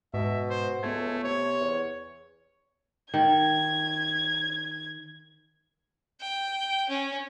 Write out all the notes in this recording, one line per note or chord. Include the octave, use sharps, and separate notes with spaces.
G#2 B2 E5
C5
C#2 A3 B3 G#6
C3 C#5
E2
D#3 G#6
G5
C#4